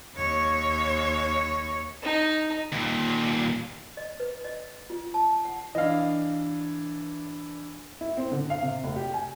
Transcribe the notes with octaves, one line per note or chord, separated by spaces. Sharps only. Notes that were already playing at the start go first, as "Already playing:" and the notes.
D#2 C#5
D#4
D#2 A#2
D#5
B4
D#5
F4
A5
F#5
E3 D4 D#5 F5
E4
C4
D3
F5
C3
F1
G4
G#5